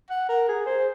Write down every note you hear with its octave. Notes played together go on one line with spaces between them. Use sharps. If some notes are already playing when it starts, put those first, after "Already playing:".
F#5
A#4
G#4
C5